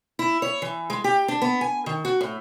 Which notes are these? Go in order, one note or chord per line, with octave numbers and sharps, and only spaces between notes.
E4
C#5
E3
G#3
G4
D4
B3
G#5
D#3
F#4
A2